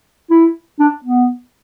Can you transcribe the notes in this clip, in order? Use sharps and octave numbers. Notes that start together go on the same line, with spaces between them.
E4
D4
B3